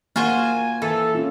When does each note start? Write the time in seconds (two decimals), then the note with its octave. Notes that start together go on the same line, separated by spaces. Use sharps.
0.16 A#3 F4 F#4 C5 G#5
0.82 E3 A4
1.15 C#4 F4